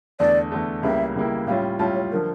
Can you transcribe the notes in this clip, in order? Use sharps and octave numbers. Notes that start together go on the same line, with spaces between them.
E2 D3 A3 D5
E2 D3 A3
C#2 C#3 G3 A#3 E4 E5
C#2 C#3 G3 A#3 E4
A2 G3 C#4 F4 F5
A2 G3 C#4 F4 A5
C#5
D3 F3 A#4